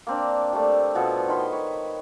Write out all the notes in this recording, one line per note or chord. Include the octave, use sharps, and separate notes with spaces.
A#3 C4 D4
G3 A3
B2 F3 B3 A4
D#3 A#4 B5 C6
B4 C#5